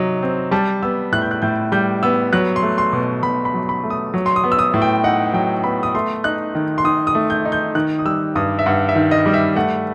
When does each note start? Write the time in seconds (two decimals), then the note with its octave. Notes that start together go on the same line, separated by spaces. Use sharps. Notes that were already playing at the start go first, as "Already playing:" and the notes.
Already playing: C3 F#3 D#4
0.22 C4
0.51 G3 A5
0.83 B3 E6
1.12 A2 F#6
1.22 G6
1.31 F#6
1.42 A2 G6
1.72 G3 G6
2.03 B3 E6
2.33 F#3 F#6
2.56 C6
2.63 A3
2.78 C6
2.93 B2
3.23 B2 B5
3.45 B5
3.54 F#3
3.69 B5
3.84 A3
3.90 D#6
4.14 F#3
4.26 C6
4.36 D#6
4.44 B3
4.52 E6
4.59 D#6
4.74 A2
4.82 G5
5.04 D#4 F#5
5.34 F#3 G5
5.64 B3 B5
5.83 D#6
5.94 A3 C6
6.24 D#4 F#6
6.55 D#3
6.78 C6
6.84 D#3 D#6
7.07 D#6
7.15 A3
7.30 G6
7.45 D#4
7.52 G6
7.75 D#3 F#6
7.99 D#6
8.05 G3 E6
8.36 G2 D#6
8.59 E5
8.66 G2 F#5
8.89 E5
8.95 D#3
9.11 D#5
9.26 G3
9.34 E5
9.56 A3 F#5